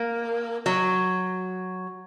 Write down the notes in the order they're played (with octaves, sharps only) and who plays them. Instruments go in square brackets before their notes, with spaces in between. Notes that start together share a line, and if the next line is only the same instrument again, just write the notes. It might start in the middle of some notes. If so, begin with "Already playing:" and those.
Already playing: [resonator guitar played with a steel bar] A#3
F#3